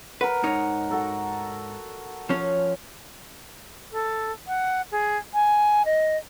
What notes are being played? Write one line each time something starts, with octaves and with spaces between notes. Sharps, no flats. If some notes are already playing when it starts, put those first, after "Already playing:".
A#4 B4 F#5
G#2 D#4 C#5
F#4 A4 A#4
F3 C#4 C#5
A4
F#5
G#4
G#5
D#5